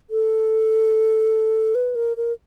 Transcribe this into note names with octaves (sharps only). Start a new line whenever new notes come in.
A4
B4
A#4
A#4